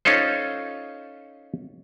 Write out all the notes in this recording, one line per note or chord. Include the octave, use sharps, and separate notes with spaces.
C#4 D#4 F4 A4 C5